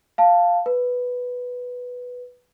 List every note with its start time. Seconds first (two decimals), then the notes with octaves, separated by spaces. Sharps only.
0.18 F5 A5
0.66 B4